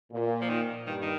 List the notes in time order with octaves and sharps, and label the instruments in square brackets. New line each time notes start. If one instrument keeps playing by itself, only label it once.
[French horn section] A#2
[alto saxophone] F3
D#3
[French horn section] G2 [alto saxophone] D#3
[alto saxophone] D#3